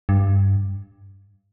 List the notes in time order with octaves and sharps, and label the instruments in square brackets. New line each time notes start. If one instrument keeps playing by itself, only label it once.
[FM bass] G2